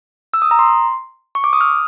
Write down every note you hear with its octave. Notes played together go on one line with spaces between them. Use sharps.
E6
D#6
A#5
C6
C#6
D6
D#6
F6